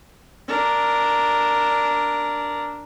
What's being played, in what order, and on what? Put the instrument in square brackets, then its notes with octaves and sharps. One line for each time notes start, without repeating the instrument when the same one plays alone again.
[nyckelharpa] D4 A#4